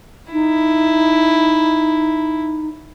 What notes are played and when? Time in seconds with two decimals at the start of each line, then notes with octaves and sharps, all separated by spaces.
0.33 D#4 E4